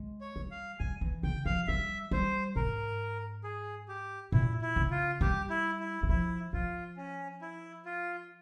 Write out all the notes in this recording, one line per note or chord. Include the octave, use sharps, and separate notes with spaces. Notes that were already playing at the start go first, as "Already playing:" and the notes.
Already playing: G#3
C#5
G3
F5
G3 G#5
E3
C#3 G5
F3 F5
G3 E5
G3 C5
G#2 A#4
G#4
G4
A#2 E4
E4
C#3
F4
G3 G4
E4
E4
E3
F3 E4
F3 F4
C#4
E4
F4